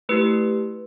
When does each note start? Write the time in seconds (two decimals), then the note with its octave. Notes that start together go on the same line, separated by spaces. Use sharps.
0.09 A3 E4 G4 B4